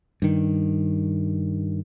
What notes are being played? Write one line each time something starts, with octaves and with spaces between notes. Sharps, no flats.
G2 D#3